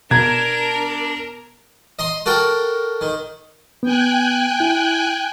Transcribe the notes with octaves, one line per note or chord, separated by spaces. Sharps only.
B2 D4 A#4 A#5 G#6
D#5 A#5 C6
F#4 A4 A#4 G5 A#5
D#3
B3 G5 G#5 F#6
E4